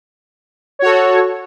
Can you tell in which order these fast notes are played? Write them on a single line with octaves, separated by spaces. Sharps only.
C#5 F#4 A4